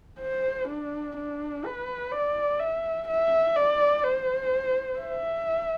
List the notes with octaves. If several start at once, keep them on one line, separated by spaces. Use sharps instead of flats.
C5
D4
D4
B4
D5
E5
E5
D5
C5
E5